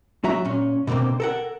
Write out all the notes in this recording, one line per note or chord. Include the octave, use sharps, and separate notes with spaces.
F#3 F#4 E5 A#5
A#2 C#4
B2 D3 A3 A#3 C4
A4 A#4 F#5